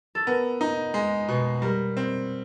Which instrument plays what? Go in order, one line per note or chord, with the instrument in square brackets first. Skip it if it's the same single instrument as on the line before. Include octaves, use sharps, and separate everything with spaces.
[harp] A4
[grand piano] B3 [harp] A#4
[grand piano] D#4
G#3
B2
[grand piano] G3 [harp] A#4
[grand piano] C4